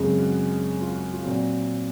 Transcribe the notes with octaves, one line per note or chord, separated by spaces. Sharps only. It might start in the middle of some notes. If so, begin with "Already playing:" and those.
Already playing: F#2 C#3 G#3 C4
F#4
F4
F#4
F4
A#2 F#3 C4 F#4